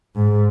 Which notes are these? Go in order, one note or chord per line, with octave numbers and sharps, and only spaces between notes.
G#2